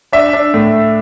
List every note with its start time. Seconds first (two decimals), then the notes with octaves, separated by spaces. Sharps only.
0.12 D4 E5
0.33 D4
0.54 A2